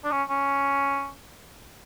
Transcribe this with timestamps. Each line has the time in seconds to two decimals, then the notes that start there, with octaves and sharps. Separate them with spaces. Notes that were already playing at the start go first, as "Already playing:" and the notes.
0.04 D4
0.12 C#4
0.29 C#4